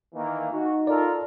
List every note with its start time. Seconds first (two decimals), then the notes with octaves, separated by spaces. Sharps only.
0.15 D#3 E3 A#3
0.52 D#4 F#4
0.87 F4 A4 A#4 D5